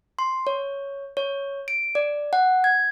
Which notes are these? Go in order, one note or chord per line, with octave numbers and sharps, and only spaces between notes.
C6
C#5
C#5
D7
D5
F#5
G#6